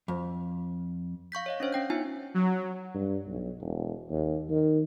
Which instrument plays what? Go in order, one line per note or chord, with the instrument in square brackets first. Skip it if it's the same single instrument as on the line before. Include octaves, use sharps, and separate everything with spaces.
[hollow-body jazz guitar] F2
[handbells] F5 C#6 G6 B6
C#5 D#5 F5
C#4 D4 C5 C#5
C#4 G5 G6
B3 D#4 F4 G#5
[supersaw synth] F#3
[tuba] G2
B1
E1
D#2
D#3